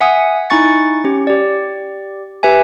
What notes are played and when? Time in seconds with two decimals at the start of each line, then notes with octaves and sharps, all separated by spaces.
0.01 E5 F#5 G#5 D#6
0.50 D#4 E4 G#5 C#6 A6 C#7
1.04 C#4 G4
1.27 G4 D5
2.43 G4 B4 E5 G#5